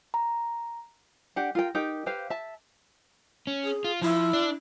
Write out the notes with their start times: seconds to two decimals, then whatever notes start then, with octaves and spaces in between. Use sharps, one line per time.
0.14 A#5
1.36 D4 G4 F#5
1.55 F4 A#4 G5
1.75 D#4 G4 A#4 G5
2.06 G4 B4 C5 F5
2.30 E5 A5
3.47 C#4
3.64 G#4
3.84 F4
4.02 F3 E4
4.33 D4 D5